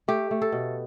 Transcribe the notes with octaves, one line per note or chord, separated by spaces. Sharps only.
A3 G4
A3
A4
B2